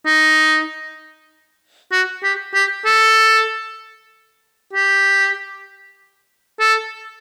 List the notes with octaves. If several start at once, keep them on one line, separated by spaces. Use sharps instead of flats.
D#4
F#4
G4
G4
A4
G4
A4